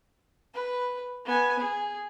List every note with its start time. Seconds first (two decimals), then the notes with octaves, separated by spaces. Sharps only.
0.54 B4
1.25 B3 G#5
1.59 G#4